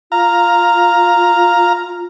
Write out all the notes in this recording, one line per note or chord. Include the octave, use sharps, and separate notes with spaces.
F4 F5 A#5